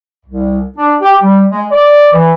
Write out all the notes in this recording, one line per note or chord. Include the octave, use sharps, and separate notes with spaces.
C2
D4
G4
G3
G#3
D5
E3